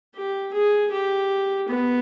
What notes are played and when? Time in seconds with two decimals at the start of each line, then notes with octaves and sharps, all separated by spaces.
0.15 G4
0.53 G#4
0.91 G4
1.69 B3